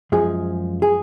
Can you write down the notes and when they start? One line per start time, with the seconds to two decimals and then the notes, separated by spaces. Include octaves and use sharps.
0.12 F#2 F3 G#3 G#4
0.82 G#4